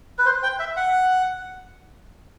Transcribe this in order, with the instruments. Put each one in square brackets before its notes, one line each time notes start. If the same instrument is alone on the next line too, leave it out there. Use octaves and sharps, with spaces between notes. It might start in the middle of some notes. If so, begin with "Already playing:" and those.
[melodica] B4
C5
G5
E5
F#5